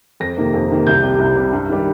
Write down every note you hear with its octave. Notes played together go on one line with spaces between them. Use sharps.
F2 A#6
C3 D#3 A#3
F2
C3 D#3 A#3
C2 G6
C3 G3
C2
C3 G3
G2
D#3 G3